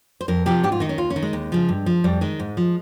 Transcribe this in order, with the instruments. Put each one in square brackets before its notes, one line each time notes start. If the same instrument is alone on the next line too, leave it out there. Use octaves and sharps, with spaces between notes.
[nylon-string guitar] C5
F2 A#4
C3 F3 G4
G#2 G4
F4
D#3 D#4
C#4
D#2 F4
C#4
D#3
G#3
D#2
C#3 F3
G2
F3
F2 G3
D#3 G#3
G#2
F3